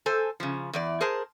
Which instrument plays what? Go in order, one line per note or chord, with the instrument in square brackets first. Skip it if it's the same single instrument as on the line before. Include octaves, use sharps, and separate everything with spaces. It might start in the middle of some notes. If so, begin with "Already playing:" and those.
[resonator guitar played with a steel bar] A4 C5 G#5
C#3 F3
E2 E3 D5
G#4 A#4 C5 A5